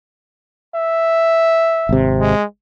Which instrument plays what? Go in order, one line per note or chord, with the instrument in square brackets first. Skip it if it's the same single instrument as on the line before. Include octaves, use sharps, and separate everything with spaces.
[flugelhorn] E5
[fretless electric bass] G#1 C3
[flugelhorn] G#3